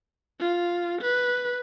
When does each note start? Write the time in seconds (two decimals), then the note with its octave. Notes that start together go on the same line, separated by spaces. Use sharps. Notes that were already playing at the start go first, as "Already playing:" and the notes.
0.40 F4
1.02 B4